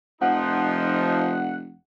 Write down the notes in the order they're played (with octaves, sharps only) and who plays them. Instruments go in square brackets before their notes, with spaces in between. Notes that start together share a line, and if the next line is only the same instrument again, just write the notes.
[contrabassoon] F1 [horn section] F3 D#4 [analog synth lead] F#5